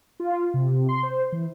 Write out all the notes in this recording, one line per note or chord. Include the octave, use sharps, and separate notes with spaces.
F4
C3
C6
C5
E3